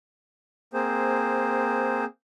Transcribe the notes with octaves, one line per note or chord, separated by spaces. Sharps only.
A#3 C4 G#4 C5